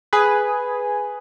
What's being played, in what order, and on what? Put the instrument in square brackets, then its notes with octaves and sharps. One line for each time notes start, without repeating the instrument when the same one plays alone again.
[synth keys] G#4 B4 [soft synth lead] G#5